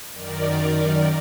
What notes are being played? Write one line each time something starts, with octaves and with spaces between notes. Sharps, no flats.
F#2 D#3 A#4 D5